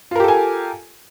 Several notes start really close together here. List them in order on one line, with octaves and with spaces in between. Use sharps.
F4 A#4 G4 A4 G#5